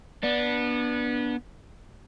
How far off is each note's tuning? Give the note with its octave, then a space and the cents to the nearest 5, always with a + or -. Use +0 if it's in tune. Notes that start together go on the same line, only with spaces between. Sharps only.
B3 -25 D4 +0